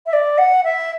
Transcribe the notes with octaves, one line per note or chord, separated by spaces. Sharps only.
E5
D5
F#5
E5